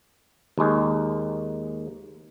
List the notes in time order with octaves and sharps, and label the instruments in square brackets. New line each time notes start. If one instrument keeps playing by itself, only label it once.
[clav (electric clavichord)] D#2 G#3